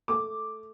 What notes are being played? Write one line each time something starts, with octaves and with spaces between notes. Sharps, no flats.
A3 D6